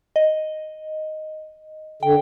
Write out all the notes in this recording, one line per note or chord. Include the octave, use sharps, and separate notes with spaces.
D#5
D3 G5